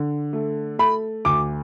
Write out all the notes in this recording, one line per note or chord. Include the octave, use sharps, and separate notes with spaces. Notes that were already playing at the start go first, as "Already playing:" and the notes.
Already playing: D3
A3
A3 B5
D2 D6